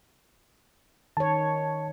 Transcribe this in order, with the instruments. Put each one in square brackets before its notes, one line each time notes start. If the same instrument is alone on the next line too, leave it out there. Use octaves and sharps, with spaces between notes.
[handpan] D#3 C#5 [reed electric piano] A5